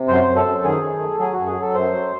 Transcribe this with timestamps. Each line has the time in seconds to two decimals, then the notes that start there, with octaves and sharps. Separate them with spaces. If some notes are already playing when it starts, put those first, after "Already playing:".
Already playing: C3
0.08 F#2 C5
0.27 F#2
0.36 A4
0.46 F#2
0.64 D#3 G#4
0.82 D#3
1.01 A3
1.19 F#3 G#4
1.33 F#2 F#4
1.47 G#4
1.57 F#3 A4
1.75 F#2 C5
1.93 F#3